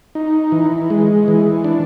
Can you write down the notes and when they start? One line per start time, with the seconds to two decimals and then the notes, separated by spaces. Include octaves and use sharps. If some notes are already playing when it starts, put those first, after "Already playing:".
0.15 D#4
0.52 E3
0.90 G#3
1.28 E3
1.64 D4